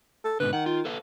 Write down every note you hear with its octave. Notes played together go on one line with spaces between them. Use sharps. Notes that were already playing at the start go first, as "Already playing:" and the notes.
A4
G#2 B2 D3 B4
D#3 F#5
F4
A4 B4 F5